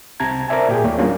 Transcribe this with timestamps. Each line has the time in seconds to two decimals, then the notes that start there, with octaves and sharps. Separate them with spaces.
0.20 C2 C3 C4 A5 A#5 G#6
0.48 A#4 C5 D5 E5 G#5 A5
0.69 A#2 G4 G#4
0.83 D#2 A3 A#3 C#5 D5
0.98 F#3 G3 A#3 C#4 D4 F4